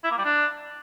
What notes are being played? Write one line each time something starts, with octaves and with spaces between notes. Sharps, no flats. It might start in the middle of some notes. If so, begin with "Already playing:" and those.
E4
A#3
G3
D4